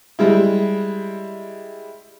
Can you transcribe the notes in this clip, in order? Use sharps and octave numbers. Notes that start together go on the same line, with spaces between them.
G3 G#3 E4